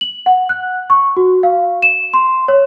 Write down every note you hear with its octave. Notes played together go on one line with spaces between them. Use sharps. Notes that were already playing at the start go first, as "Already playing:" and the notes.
F#7
F#5
F#6
C#6
F#4
F5
E7
C6
C#5